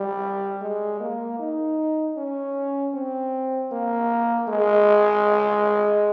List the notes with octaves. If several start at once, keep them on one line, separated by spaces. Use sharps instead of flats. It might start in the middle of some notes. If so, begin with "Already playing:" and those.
Already playing: G3
G#3
A#3
D#4
C#4
C4
A#3
G#3